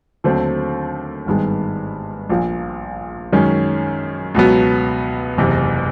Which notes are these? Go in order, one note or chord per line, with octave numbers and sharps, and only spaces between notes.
D#2 D3 F#3 A3 C4
G#1 G2 D#3 G#3 B3
A#1 A#2 F3
F#2 D#3 G#3 C#4
C#2 B2 F#3 B3
F#1 E2 C3